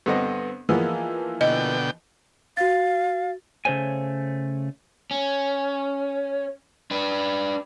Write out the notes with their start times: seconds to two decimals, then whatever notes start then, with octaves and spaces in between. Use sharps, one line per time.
0.06 G2 D3 B3 C4 D#5
0.69 E3 F3 G#3 A#3 B3
1.41 B2 D3 D#5 G5
2.57 F#4 F5 A6
3.65 C#3 A3 C5 C#5 G#5
5.11 C#4
6.91 D4 B4